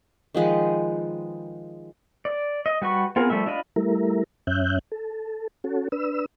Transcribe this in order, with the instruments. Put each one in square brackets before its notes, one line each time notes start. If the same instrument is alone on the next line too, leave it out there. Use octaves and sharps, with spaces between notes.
[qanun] D#3 F3 G#3 B4
[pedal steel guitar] D5
D#5
G3 F#4 B4 C#6
B3 C4 F4 G#4 A#4
F3 G3 A3 E5
D4 F4 D#5 B5
[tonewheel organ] G3 A3 E4 A#4
F#2 C#4 E5 F#6 G6
A4
C#4 F#4 A4
D4 B4 E6